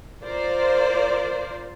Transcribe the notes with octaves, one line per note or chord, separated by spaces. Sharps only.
F4 A#4 C5 D5